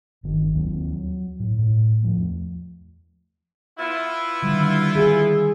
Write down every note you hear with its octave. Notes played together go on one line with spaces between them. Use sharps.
G1 D#3 E3
D#2 F#3 G3 C4
F#3
A2
A2
E2 F3 A3
B3 E4 F4
D3 D#3 G3
G#4